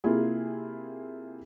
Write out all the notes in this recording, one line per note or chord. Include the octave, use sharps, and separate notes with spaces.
C3 A#3 E4 F4 G#4